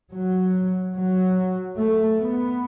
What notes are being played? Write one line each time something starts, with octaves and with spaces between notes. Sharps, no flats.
F#3
F#3
A3
B3